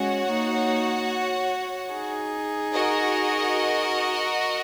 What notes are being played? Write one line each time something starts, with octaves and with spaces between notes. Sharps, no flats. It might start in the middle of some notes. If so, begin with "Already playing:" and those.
Already playing: G#3 C#4 F#4 C#5 F#5
A#3 D#4
D#4 G#4
F#4 A#4 D#5